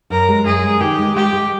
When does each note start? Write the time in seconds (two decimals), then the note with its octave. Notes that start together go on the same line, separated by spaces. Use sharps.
0.10 F#2 A#4
0.29 G#3
0.45 F#2 G#4
0.64 G#3
0.80 D#3 G4
0.98 G#3
1.16 G#3 G4
1.33 G#3